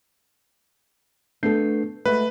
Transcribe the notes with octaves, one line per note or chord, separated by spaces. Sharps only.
A3 B3 D4 A4 G6 C7
G#3 A3 F#4 B4